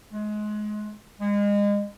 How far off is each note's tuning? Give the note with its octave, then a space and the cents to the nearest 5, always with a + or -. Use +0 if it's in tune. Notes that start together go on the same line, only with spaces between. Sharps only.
G#3 +25
G#3 -30